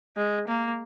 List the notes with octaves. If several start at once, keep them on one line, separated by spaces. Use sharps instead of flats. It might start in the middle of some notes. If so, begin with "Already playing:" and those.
G#3
A#3